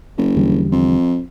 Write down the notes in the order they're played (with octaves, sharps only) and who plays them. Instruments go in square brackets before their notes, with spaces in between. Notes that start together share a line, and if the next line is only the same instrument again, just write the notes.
[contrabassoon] F#1
[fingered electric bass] E2 D3 G3
[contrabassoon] F2